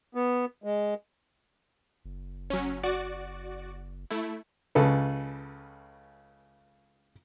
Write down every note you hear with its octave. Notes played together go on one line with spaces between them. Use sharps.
B3
G#3
F#1
F#3 C#4
F#4 D5
A3 E4
C#2 C#3 A4 B4